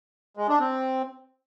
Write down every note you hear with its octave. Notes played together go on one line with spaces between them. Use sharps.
G#3
D4
C4